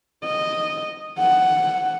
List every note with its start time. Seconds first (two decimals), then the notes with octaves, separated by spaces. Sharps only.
0.24 D#5
1.19 F#5